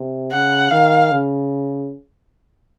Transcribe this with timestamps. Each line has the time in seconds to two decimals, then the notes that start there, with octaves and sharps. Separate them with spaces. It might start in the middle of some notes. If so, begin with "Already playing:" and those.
Already playing: C3
0.32 C#3 F#5
0.71 D#3 F5
1.11 C#3